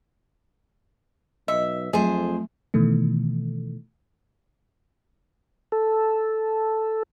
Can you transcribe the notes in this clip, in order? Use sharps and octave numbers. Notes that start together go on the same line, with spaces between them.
B1 D#5 E5
F2 F#3 A3 G#4 C5
B2 D#3 E3 A3
A4